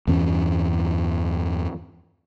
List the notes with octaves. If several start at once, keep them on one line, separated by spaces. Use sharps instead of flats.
E2 G2 E3 C#4